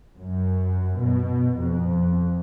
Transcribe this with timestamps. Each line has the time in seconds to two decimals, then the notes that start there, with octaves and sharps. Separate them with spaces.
0.17 F#2
0.97 B2
1.56 F2